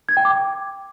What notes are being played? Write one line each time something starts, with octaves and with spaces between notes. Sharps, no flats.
G#6
G5
D6